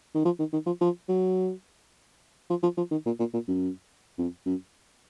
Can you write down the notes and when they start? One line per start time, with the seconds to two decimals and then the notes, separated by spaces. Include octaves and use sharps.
0.15 D#3
0.25 F3
0.39 D#3
0.53 D#3
0.66 F3
0.81 F3
1.09 F#3
2.50 F3
2.63 F3
2.77 F3
2.91 D#3
3.06 A#2
3.19 A#2
3.34 A#2
3.48 F#2
4.18 F2
4.46 F#2